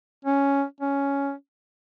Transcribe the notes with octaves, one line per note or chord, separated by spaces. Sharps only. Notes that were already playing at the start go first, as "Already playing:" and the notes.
C#4
C#4